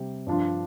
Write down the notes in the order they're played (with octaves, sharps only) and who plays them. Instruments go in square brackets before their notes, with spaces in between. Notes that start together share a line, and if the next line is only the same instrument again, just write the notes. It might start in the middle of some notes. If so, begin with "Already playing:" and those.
Already playing: [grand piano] C3 G3 C4 G4
G2 F3 D4 F4